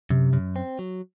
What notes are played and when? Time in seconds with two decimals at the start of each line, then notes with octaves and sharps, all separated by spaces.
0.10 F#2 C3
0.33 F#2
0.56 C4
0.79 F#3